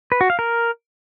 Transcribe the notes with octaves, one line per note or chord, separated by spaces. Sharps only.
B4
F#4
F5
A#4